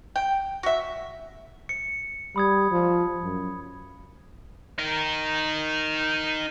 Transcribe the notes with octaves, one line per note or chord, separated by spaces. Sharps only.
G5
F#4 E5
C#7
G3 B5 D#6 G#6
F3
F#2
D#4 A#4